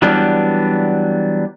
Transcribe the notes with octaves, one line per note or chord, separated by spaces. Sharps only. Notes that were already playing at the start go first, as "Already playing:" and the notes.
E3 F#3 G3 B3 D4